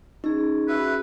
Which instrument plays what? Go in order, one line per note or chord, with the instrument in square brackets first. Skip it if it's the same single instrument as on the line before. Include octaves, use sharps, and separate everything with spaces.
[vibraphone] C#4 G#4 [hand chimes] D#4
[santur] F#4 E5 [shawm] B4